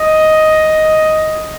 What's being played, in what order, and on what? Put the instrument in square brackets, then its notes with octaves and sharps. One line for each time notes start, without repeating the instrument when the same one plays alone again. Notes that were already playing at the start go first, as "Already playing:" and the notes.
Already playing: [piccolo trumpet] D#5